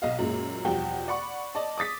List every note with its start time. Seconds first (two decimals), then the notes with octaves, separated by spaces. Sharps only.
0.02 B1 D#5 F5
0.19 F#2 A#2 G#3
0.65 E2 B2 F3 G3 F#4 G5
1.08 D5 F#5 B5 C#6
1.55 D5 D#5 A5
1.78 D6 D#6 A6 B6